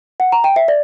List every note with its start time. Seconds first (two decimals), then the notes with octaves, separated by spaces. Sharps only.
0.20 F#5
0.32 A#5
0.44 G5
0.56 E5
0.68 D5